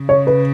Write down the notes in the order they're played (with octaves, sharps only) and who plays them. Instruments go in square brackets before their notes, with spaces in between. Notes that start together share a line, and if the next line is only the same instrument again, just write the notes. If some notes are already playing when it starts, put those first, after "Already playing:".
Already playing: [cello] C#3
[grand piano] C#5
B4